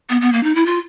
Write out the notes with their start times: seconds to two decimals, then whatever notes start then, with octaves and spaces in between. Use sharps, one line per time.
0.10 B3
0.21 B3
0.32 A#3
0.44 D#4
0.55 E4
0.66 F4